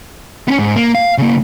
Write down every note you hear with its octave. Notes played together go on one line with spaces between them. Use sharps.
B3 C#4
G#2
A#3
F5
C#3 A#3